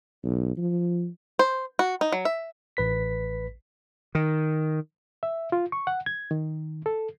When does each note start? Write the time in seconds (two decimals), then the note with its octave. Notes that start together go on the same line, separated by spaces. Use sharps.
0.24 B1
0.57 F3
1.39 C5
1.79 F#4
2.01 D#4
2.12 F#3
2.25 E5
2.77 A1 B4 B6
4.15 D#3
5.23 E5
5.52 F4
5.72 C#6
5.87 F#5
6.06 G#6
6.31 D#3
6.86 A4